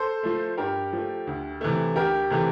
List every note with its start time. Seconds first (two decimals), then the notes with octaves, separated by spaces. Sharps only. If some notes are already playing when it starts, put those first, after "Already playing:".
Already playing: A4 C5
0.23 F3 A3
0.57 G2 G4 A#4
0.93 F3 A3
1.27 D2
1.61 C3 E3 A3
1.95 D2 G4 A#4
2.30 C3 E3 A3